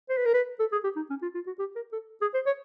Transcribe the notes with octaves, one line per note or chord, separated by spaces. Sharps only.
C5
B4
A#4
B4
A4
G#4
G4
D#4
C#4
F4
F4
F#4
G4
A#4
A4
G#4
C5
C#5